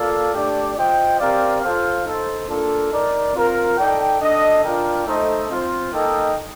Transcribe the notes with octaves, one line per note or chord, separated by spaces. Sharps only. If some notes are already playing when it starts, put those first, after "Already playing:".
Already playing: A#3 F4 A4 D5 F5
A3 D4 G4 D5
F4 C5 D#5 G5
C4 G4 A#4 D5 F5
F4 A4 C5 F5
D#4 A4 C5
A#3 D4 F4 A4
D#4 A#4 D5
C4 F4 A#4
D#4 A4 D5 G5
D4 A4 D#5
D4 F4 A#4 D5 G5
A3 D#4 A4 C5 D#5
C4 F4 C5
A#3 D#4 A4 D#5 G5